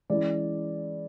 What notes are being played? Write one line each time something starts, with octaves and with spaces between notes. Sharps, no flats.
E3 G#3 C#4 E4 D5